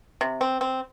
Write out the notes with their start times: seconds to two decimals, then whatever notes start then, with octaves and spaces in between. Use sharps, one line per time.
0.21 C3
0.41 C4
0.61 C4